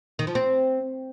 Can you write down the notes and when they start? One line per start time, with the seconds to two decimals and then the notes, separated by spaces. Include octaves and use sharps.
0.19 D#3
0.27 F3
0.35 C4